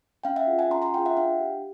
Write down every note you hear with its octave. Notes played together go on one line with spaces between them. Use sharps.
C#4 F5 G5
E5 F#5
F4 G#4
F#5 G#5
C#4 A#5 C6
A#5 C6
F4 G#4 F5 G5
E5 F#5
D4 F5 G5
G4